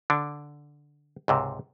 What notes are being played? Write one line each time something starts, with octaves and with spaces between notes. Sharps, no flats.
D3 D4
C#2 G#2 C3